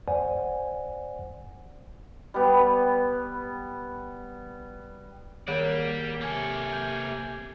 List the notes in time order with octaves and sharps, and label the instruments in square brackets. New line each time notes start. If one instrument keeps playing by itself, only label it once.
[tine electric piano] C5 D5 F#5 G#5
[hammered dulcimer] G3 B3
[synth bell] D#3 C#5 D7 [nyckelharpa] A#3 [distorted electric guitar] G4 D5
[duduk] C3 [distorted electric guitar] A#3 A4 [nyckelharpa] G#5
[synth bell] G6